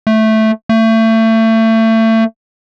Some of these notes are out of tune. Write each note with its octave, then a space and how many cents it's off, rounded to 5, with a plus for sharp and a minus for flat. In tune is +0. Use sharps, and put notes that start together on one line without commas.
A3 -5
A3 +30